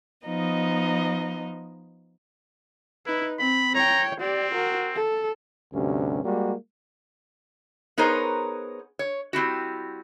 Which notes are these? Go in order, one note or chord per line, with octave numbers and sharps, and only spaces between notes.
F3 B3 D#4 D#5
D#4 E4 B4
C4 B5
C#5 G5 A#5
C4 G4 D5
F#4 A#4
A4
D2 G2 C3 C#4
G3 G#3 A#3 F#4
B3 D#4 G#4 A#4 C5 C#5
C#5
G3 C4 E4 F#4